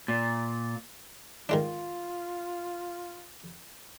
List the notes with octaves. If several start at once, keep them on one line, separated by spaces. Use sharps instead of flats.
A#2
D#3 G#3 D4 F4